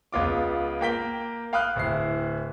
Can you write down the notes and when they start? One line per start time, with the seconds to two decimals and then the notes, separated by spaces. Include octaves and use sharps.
0.12 C#2 B3 F4 D6
0.81 A#3 G5 B6 G7
1.53 F5 G5 B5 D#6 F6 F#6
1.76 D1 E4 C7